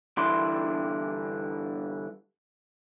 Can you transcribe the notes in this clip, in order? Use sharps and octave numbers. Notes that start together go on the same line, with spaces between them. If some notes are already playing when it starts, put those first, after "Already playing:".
G2 D3 E3 D4 E4 C6